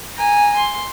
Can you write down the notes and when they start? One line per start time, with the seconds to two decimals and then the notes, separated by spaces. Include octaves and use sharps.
0.16 G#5 A#5
0.56 C6